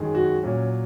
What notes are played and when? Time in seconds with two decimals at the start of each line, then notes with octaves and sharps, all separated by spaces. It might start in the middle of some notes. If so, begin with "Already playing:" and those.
Already playing: F#2 D#3 G#3
0.15 F#4
0.43 A#2 F#3 C#4